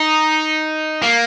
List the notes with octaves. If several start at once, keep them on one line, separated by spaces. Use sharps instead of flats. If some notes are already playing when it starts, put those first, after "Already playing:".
Already playing: D#4
A#3